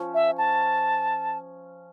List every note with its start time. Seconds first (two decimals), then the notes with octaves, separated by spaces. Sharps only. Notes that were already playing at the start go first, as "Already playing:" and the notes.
Already playing: F3 C#4
0.14 E5
0.38 A5